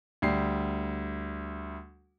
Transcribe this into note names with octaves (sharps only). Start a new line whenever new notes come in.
D2 G3 C7